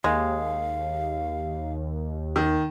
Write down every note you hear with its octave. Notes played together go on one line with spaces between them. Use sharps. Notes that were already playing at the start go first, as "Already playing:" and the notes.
D#2 G#3 F5
D#3